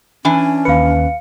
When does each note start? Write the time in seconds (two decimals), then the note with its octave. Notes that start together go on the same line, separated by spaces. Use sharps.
0.25 E3 C#4 D4 G#5
0.65 D#2 B4 F5 C#7